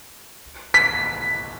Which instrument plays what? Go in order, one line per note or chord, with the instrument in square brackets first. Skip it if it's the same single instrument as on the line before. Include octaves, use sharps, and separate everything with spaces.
[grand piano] B6